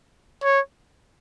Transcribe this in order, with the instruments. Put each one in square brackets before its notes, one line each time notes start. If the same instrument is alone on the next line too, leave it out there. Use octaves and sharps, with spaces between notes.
[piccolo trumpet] C#5